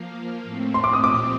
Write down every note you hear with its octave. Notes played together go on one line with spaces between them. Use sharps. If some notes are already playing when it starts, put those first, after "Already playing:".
Already playing: F3 A#3 F4
A2 A3 C4
C6
D6
D#6
A#2 F3 C4 G4 D6